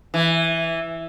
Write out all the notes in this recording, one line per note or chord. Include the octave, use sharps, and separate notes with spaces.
E3